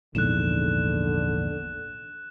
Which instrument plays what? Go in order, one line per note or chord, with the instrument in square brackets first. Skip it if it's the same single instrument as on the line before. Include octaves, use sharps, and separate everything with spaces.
[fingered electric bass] A#1 E2 G#2 [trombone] D3 [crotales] F#6 E7